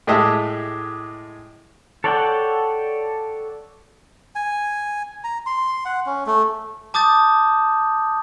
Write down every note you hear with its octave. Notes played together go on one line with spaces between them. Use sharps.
A2 G#3 G4 D#5 E5 A5
A4 C#5 D5 F#5 G5
G#5
A#5
C6
F#5
C#4
A3
A5 D6 D#6 G6 A6